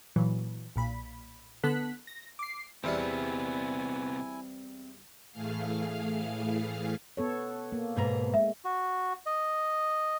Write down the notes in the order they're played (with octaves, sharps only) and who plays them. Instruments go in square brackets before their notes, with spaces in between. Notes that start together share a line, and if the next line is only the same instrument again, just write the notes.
[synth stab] A#2 E3 F#3
B1 A#2 B5
D3 B3 A4 F#6 B6
A#6
D6 C7
[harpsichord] E2 E3 G3 [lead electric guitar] C3 B3 [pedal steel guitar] C4 [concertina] E4 G#5
[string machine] A2 E3 A3 G#4 F5 F6
[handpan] B3 A4 C#5
A#3
[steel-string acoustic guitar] G#2 B2 A#5
[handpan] G#3 [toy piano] E5
[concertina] F#4
D#5